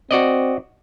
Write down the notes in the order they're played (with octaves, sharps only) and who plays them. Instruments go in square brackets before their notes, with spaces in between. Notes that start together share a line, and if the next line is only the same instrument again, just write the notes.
[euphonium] C4 [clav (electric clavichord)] F#4 D5 D#5